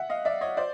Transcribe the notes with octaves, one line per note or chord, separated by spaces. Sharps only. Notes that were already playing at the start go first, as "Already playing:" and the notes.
Already playing: E5 F#5
D#5 F5
D5 E5
C#5 D#5
C5 D5